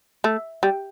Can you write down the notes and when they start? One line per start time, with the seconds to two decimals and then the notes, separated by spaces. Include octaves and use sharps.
0.24 A3
0.63 G3